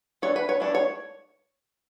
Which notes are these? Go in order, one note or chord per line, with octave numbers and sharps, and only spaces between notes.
E3 A3 D4 C#5
B4
C#5
E3 A3 D4
C#5